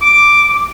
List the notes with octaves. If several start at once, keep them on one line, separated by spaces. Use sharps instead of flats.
D6